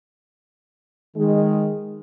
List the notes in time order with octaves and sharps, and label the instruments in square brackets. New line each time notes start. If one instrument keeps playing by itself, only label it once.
[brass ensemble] D#3 G#3